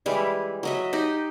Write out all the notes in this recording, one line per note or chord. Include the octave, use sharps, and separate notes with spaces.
E3 G3 G#3 E4
F#3 D#5 E5
D#4 G4 D#5